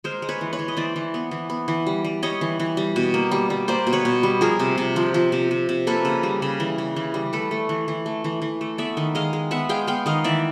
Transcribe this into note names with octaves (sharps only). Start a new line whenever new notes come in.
G#3 A#4 C5
G#3
B4 C#5
E3
B4 C#5
E3
D#5
E3 C5 D5
E3
B3
E3
B3
E3
G3
G3
G3 C#5 D#5
E3
E3
G3
B2
A#3
G3
G3
A#3 C5 D5
B2
B4 C#5
B2
G3
F3 G#4 A#4
C3
C3
F3
F3
C3
C3
C3
A#3 A4 B4
C#3
G3
C#3
E3
C#3
E3
G3
A3 A4 B4
A3
E3
E3
A3
E3
E3
A3
B3 D5 E5
D#3
G#3 D#5 F5
G#3
B3 E5 F#5
G#3 F5 G5
B3 F5 G5
D#3 D#5 F5
E3 D5 E5